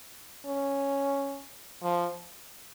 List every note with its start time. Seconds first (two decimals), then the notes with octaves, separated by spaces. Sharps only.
0.45 C#4
1.82 F3